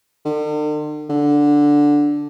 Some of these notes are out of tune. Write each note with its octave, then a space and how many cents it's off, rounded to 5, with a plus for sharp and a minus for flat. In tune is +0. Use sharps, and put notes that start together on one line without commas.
D3 +45
D3 -5